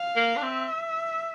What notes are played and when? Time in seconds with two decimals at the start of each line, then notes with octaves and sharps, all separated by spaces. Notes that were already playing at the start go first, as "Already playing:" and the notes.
Already playing: F5
0.16 A#3
0.36 D4
0.42 C4 E5